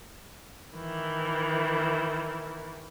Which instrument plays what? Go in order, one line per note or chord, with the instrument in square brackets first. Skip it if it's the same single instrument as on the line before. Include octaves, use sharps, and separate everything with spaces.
[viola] D#3 E3